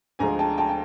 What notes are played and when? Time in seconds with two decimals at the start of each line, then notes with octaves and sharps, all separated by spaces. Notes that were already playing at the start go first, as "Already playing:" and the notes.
0.19 D2 D3 F3 G#3 G#5 A#5
0.39 G5 A5
0.58 G5 A5
0.69 G5